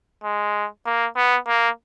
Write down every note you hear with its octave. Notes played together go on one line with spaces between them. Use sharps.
G#3
A#3
B3
A#3